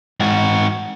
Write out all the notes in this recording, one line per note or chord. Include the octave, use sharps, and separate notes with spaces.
G#2 F#4